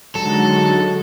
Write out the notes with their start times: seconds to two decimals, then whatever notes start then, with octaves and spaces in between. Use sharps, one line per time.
0.15 D3 F#3 G#3 D#4 F#4 A4